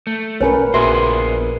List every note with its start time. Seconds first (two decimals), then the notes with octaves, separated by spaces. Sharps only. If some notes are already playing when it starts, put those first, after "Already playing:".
0.07 A3
0.41 B1 C#4 A#4 B4 C#5
0.74 A#1 B3 F#4 G#4 C5 E5 C6